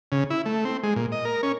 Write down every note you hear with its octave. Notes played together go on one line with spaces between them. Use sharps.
C#3
E4
A3
C4
G#3
A#2
D#5
A#4
C#4